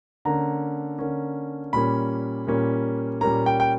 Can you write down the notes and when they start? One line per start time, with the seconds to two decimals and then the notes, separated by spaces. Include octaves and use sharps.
0.25 D3 A#3 C#4 A#5
0.99 D3 A#3 C#4
1.73 A#2 G3 A#3 C#4 B5
2.47 A#2 G3 A#3 C#4
3.21 A#2 G3 A#3 C#4 A#5
3.46 G5
3.60 G5